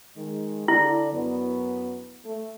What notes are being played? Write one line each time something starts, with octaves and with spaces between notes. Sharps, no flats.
D#3 G#3
D3 E4 D5
F#2 F#3 B3
A3